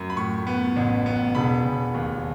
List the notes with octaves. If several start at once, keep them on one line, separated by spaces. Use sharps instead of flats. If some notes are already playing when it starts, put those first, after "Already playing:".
Already playing: F#2
B5
A2 C#6
B3
A1
B3
E1 B5
E1
D#2